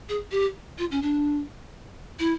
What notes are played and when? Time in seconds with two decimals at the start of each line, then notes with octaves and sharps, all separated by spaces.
0.09 G#4
0.31 G4
0.78 F4
0.91 C#4
1.02 D4
2.19 E4